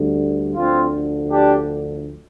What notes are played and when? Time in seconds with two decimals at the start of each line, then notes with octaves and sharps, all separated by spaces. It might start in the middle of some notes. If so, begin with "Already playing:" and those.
Already playing: D2 D3 G3
0.55 D2 D3 F3 C4 F4
1.31 D4 G4